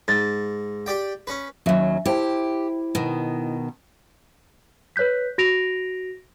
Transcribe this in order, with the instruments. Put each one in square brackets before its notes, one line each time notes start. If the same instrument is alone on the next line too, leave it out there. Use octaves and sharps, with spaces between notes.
[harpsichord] G#2 [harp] A6
[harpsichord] G4 D5 G5
C#4 B4
[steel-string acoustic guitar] D#2 F#3 [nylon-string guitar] C#4 E5
[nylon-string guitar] E4 C5 A5 [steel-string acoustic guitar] G4
[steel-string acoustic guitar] B2 D#3
[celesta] B4 C#5 F#6 G6 B6
F#4 A#6 D7 F7